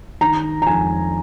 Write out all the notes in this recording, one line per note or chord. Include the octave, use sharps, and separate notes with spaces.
D#3 A#5
A#5
F2 G#5